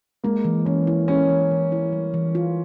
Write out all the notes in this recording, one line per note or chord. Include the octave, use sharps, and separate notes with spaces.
G#3 A#3
E3
E3 C#4
E4
G#3 C#4
E3
E3
E4
G3
E3
F4